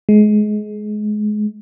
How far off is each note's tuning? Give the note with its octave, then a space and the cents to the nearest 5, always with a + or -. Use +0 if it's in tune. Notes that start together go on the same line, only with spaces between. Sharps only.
G#3 +25